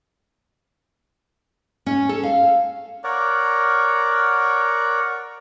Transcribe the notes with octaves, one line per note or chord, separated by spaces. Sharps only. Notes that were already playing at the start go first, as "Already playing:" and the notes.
C#4
A4
F5
A#4 C#5 D5 F#5